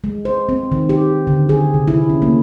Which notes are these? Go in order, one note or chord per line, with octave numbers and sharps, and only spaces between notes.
G#3
C5
C4
D#3
G4
D3
G#4
C3
E4
C#4
A#3